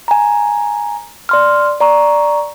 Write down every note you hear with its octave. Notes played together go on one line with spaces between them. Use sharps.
G#5 A#5
D5 C6 F6
D5 A#5 C#6